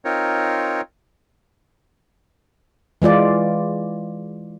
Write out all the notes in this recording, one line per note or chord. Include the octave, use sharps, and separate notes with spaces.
C4 D#4 F4 A#4 C#5
E3 G#3 F4 D5